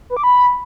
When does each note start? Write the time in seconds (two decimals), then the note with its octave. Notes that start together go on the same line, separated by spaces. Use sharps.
0.10 B4
0.17 D6
0.23 B5